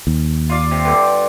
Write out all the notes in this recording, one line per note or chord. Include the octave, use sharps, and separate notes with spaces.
D#2
F4 D5 F5
C3
G2 D3 A4